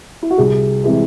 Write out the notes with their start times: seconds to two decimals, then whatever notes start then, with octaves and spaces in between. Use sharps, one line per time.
0.22 E4
0.30 F#4
0.38 C2 G#4
0.84 C3 E3 G#3